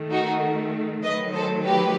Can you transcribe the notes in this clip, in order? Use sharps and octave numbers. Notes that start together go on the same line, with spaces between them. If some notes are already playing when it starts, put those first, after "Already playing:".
Already playing: D#3 A3
D#4 F#4
D#3 F#3 A3 B4 D#5
A4 C5
G4 B4